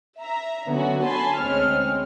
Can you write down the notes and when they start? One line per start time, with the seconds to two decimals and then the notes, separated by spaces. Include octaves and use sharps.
0.20 E5 A#5
0.69 D3 F#3 B3 C#4 F#4
1.05 G#5 A5 B5 C6
1.41 D2 G#3 C4 C#4 C#5 F6